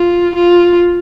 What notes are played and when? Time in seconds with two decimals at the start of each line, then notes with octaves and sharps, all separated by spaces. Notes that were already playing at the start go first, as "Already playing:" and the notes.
Already playing: F4
0.35 F4